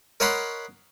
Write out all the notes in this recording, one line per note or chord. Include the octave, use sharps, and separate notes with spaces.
A#4 C#5 D#5 F#5 B5 C6